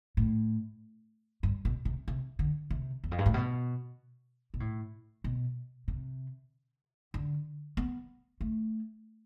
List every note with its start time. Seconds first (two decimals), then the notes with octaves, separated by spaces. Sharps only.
0.17 A2
1.43 G2
1.65 B2
1.85 C3
2.08 C3
2.39 D3
2.70 C3
3.04 E2
3.11 F2
3.18 G2
3.26 A2
3.34 B2
4.54 B2
4.60 A2
5.24 B2
5.88 C3
7.14 D3
7.77 B3
8.41 A3